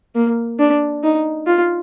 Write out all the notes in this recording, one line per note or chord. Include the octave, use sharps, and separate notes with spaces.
A#3
D4
D#4
F4